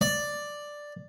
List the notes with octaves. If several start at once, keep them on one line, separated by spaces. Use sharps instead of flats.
D5